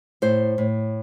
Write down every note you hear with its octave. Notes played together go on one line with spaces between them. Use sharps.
A2 C5
A2